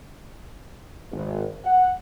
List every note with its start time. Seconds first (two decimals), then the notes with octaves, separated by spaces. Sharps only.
1.12 G#1
1.65 F#5